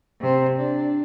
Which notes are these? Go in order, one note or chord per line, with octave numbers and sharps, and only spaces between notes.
C3 C5
D4